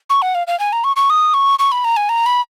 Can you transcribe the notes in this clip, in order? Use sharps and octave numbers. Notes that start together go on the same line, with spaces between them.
C#6
F#5
F5
F5
G#5
A#5
C#6
C#6
D#6
C#6
C#6
B5
A#5
G#5
A#5
B5